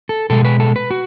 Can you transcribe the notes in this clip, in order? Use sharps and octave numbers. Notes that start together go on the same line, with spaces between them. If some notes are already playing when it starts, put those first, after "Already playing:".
A4
B2 G#3 A4
B4
A4
B4
F#4